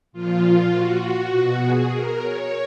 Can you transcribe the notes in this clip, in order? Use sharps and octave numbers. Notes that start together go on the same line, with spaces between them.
A#2 F3 F4
F#4
B2
G#4
A#4
C#5